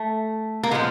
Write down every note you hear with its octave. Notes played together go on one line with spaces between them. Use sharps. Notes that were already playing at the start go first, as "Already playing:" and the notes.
Already playing: A3
A#3
A#2 F3 G#3 B3